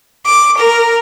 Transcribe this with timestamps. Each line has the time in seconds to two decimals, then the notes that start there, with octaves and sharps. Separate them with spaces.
0.24 D6
0.57 A#4